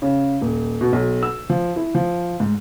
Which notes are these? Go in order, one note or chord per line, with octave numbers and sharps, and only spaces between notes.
C#3
D#1
B2
B1
E6
F3
E4
F3
G#2